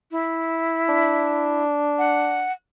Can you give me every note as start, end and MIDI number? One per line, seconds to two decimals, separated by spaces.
0.11 1.63 64
0.89 2.45 62
1.98 2.52 78